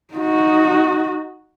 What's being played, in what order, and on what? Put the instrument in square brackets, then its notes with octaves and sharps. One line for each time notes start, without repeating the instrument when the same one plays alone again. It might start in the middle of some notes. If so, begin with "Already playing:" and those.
[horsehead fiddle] D#4 F#4